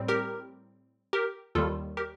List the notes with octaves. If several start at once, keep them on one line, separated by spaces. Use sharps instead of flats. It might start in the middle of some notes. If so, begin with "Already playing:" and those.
Already playing: A2 G3 C4
G4 A#4
G4 A#4
D#2 D#3 G3 F4 A4
G4 A#4